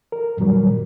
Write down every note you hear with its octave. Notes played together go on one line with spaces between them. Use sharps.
A#4
F#2 A#2 D#3 F#3 G3